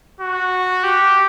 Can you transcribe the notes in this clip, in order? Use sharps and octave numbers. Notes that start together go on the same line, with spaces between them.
F#4
G4